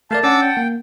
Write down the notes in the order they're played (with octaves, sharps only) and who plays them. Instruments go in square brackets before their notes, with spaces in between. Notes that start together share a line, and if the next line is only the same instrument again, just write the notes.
[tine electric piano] A3 A#4 D5 [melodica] F5 [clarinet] A5
[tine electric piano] C#4 [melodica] D4 D6 E6 [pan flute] F#5
[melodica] G5
[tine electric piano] A#3